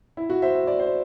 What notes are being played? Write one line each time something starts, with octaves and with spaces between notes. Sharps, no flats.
E4
F#4
C5 E5
E5
D5
C5